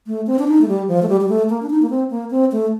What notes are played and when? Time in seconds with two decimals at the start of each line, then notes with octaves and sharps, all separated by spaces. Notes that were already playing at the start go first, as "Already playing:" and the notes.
0.07 A3
0.27 C4
0.39 D4
0.48 D#4
0.61 A3
0.68 G3
0.88 F3
1.02 A3
1.09 G3
1.21 G3
1.29 A3
1.49 A#3
1.62 D4
1.70 D#4
1.82 A#3
1.90 C4
2.10 A#3
2.31 C4
2.52 A3